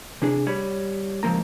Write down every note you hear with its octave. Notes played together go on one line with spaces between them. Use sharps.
C3 D4 G#4
G3 C#5 B5
C#2 G2 F3 A#3 A#5